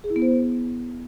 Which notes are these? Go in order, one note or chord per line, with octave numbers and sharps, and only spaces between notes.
G#4
E4
B3
C5